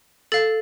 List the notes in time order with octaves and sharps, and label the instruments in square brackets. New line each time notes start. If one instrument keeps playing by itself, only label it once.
[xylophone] A4 F5 A6